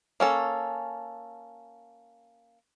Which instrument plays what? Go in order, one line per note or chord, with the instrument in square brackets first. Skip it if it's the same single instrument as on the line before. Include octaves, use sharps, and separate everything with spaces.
[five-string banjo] A#3 C#4 A4